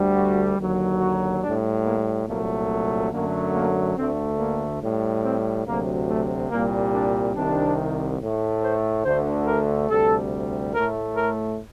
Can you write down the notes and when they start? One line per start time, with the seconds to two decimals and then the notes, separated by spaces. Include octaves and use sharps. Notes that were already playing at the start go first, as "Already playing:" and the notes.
Already playing: D2 D3 G3
0.15 F#4
0.57 D#2 D3 F#3
1.00 F#4
1.42 A2 G3 D4
1.84 A#3
2.26 C2 A#2 F#3 A3 A#3
3.11 F#2 D3 F#3 A3 A#3
3.54 A#3
3.96 D2 D3 A3 C4
4.38 A#3
4.80 A2 G3
5.23 C4
5.65 D2 C3 F#3 A#3
6.08 A3
6.50 C2 A#2 G3 A#3
6.93 D4
7.35 C2 C3 D#3 D4
8.19 A2 A3
8.62 C5
9.04 D2 D3 A3 C5
9.46 A#4
9.89 D2 C3 G3 A4
10.73 A2 A3 A#4
11.16 A#4